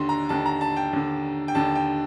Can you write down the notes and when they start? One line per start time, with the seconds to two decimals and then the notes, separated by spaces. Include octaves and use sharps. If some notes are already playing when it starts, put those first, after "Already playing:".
Already playing: D#2 D3 C6
0.09 A#5
0.29 D#2 D3 A5
0.46 A#5
0.61 A5
0.76 G5
0.93 D#2 D3
1.48 G5
1.55 D#2 D3 A5
1.75 G5